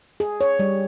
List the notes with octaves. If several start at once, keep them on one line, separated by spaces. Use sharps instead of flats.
G#4
C#5
G3